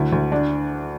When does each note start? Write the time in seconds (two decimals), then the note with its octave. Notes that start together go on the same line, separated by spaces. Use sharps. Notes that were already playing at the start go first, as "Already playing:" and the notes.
Already playing: D2 E4
0.12 D2
0.32 D4